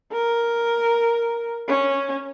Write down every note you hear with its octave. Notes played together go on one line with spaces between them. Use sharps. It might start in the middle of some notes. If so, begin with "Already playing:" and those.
A#4
C#4